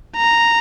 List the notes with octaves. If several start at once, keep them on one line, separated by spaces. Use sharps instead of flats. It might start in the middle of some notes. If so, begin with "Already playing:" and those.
A#5